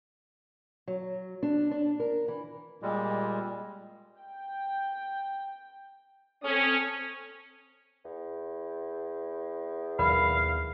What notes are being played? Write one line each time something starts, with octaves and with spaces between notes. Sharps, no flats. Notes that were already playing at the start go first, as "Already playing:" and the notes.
F#3
D4
D4
A#4
E3
A#2 G3 G#3
G5
C4 C#4 A4 D#6
E2
D#2 B2 F#3 A#4 D5 F5 B5